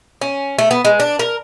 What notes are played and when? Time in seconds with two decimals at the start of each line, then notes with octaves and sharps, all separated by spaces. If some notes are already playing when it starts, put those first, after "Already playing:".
0.21 C#4
0.59 A3
0.71 B3
0.85 G#3
1.00 D4
1.19 A#4